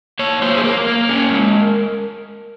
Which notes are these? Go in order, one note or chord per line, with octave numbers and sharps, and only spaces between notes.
A#3 C#5
F#3 C5
G#4
A#3 A#4
A#3
C#4
G#3